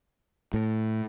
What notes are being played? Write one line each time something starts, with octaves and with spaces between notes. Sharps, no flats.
A2